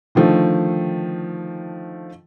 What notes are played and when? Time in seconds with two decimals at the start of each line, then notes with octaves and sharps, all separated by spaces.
0.15 D3 D#3 F3 A3